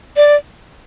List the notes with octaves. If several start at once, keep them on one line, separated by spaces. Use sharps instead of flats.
D5